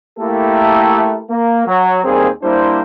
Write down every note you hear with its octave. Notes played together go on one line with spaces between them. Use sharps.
A3 A#3 E4 G4 A4 A#4
A#3
F#3
D#2 G3 A#3 C4 G#4
G3 A#3 D4 E4 C5